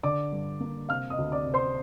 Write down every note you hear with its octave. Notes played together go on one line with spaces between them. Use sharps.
D3 D5 D6
G2
A#3
C3 F5 F6
D#5 D#6
D2
D5 D6
C3
C5 C6